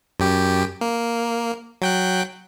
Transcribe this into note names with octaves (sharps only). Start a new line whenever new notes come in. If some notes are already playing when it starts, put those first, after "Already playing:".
F#2 G4
A#3
F#3 G5 F#6